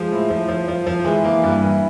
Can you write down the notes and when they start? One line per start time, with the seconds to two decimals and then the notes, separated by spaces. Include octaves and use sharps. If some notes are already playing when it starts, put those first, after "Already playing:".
Already playing: F3 G#3
0.12 A2
0.30 F3
0.49 F3
0.68 F3
0.87 F3
1.05 E3 G#3
1.23 E3 A#3
1.43 G2
1.62 E3